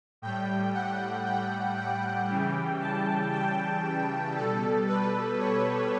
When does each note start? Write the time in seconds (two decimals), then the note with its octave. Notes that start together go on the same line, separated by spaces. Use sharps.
0.22 A2 G3 G5
0.74 F#5
1.26 G5
1.77 G5
2.29 C#3 E3 G3
2.81 A5
3.32 G5
4.35 B2 G3 A4
4.87 B4
5.39 C#5